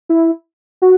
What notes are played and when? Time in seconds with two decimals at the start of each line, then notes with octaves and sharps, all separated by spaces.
0.09 E4
0.82 F#4